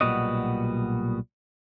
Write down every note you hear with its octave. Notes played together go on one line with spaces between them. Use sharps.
B1 A#2 G3 B3 F#4 D#5